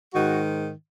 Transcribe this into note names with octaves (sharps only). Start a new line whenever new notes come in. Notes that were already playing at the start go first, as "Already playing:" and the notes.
G#2 D#3 F#4